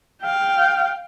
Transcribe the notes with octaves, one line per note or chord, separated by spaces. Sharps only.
F5 G5